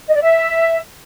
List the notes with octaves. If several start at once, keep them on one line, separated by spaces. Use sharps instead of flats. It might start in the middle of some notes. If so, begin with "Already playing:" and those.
D#5
D5
E5